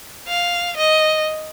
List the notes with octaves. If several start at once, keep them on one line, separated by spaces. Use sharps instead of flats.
F5
D#5